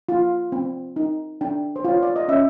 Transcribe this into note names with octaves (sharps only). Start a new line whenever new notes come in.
F4
C4
D#4
D4 G5
C5
F4 C#5
D5
D#5
C#4 E5